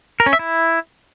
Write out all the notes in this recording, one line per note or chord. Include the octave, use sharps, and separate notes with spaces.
A#4
C#4
E5
E4